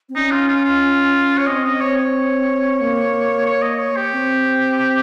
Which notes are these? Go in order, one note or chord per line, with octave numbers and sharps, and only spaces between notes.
C4
C#4 D#4
F4
F4
F4
C#5
C4 D#5
D#5
C#5
C#5
A#3
C#5
D#5
C#5
G4
C4